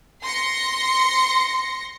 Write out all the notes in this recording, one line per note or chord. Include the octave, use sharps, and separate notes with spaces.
C6 A#6 C#7